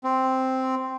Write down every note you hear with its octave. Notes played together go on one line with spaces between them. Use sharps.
C4